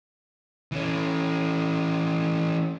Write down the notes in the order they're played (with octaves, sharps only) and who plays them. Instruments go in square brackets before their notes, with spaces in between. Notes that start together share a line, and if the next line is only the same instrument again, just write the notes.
[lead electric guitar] E3 C#4